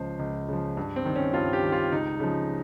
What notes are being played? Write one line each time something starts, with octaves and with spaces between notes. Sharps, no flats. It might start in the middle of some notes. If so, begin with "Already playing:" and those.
Already playing: C#2 C#3 F3 C5
C#2
C#3 F3
G2
C4
D#3
C#4
G2 F4
G4
D#3
F4
C#2 D#4
C#3 F3